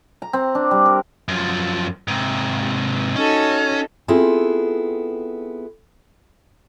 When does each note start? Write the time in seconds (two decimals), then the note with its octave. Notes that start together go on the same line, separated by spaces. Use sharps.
0.22 A#5
0.33 C4
0.55 D4
0.71 G3
0.86 A#4
1.28 F#2 F3
2.08 G#2 C3
3.16 C#4 D#4 F#4 A4
4.08 B3 C4 E4 F4 G#4 A4